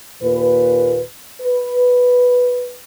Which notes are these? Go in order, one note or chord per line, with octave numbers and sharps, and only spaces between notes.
D#2 A#2 B4
B4